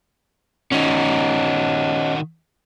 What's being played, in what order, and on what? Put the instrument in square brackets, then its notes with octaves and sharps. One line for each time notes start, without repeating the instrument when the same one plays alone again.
[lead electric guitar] D#3 F#4 [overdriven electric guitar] C#4 D#4